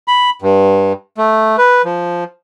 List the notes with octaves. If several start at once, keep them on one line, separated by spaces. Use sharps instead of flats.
B5
G2
A3
B4
F3